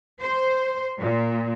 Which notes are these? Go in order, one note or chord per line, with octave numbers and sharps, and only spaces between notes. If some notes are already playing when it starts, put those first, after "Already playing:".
C5
A#2